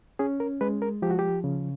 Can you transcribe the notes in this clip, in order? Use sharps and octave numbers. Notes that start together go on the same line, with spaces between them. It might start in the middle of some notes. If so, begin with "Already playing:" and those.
C#4 G#4
A#4
G#3 B4
A#4
F3 G4
F#4
G4
C#3